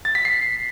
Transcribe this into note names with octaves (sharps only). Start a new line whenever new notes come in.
A6
B6
C7